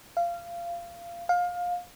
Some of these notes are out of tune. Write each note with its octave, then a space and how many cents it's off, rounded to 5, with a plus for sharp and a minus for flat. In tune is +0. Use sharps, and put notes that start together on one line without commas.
F5 -20
F5 +25